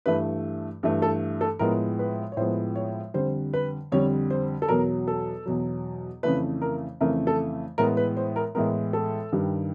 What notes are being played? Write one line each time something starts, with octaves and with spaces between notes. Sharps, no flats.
G2 E3 A3 B4
G2 E3 A3
A4
A4
A2 F3 G#3 B3 A#4
B4
C#5
A2 F3 G#3 B3 C5
C#5
F2 D3 G3 C5
B4
F2 D3 G3 C#5
C5
A4
E2 B2 F#3 A#4
A4
E2 B2 F#3
F2 C#3 E3 A3 B4
A#4
F2 C#3 E3 A3 A#4
A4
A2 E3 G#3 B3 A#4
B4
C5
A#4
A2 E3 G#3 B3 A#4
A4
G2 D#3 G3